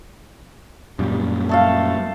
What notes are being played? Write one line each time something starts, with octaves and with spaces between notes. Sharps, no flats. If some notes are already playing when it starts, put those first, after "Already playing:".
F#2 A#2 G3
A3 A4 F5